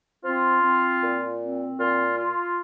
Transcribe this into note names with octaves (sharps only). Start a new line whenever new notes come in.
C4 F4
C4
A#2
C4
A#2 F4
F4